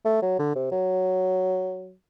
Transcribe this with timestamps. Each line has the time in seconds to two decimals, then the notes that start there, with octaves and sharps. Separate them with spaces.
0.05 A3
0.22 F#3
0.39 D3
0.55 C3
0.72 F#3